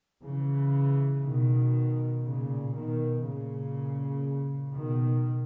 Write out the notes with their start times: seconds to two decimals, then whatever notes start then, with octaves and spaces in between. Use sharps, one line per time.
0.23 C#3 E3
1.23 B2 D#3
2.23 A#2 C#3
2.74 B2 D#3
3.24 A#2 C#3
4.74 B2 D#3